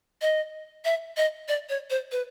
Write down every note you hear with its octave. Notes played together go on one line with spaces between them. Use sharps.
D#5
E5
D#5
D5
C#5
C5
B4